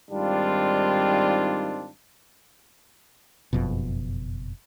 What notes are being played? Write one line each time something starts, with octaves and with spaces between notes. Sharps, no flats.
G#2 D#3 G3 C4 D4 F4
F#1 F2 B2